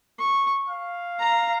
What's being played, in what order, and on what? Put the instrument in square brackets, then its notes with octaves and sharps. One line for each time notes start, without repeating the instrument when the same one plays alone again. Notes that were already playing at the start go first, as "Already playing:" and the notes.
[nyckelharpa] C#6
[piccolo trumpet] F5
[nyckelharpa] A#5